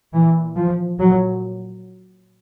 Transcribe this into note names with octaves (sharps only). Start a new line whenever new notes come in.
A#2 E3
F3
A#2 F#3